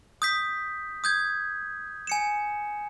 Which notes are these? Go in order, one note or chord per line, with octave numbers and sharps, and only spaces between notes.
D#6 G6 B6
D#6 G6 G#6
G#5 C#7 E7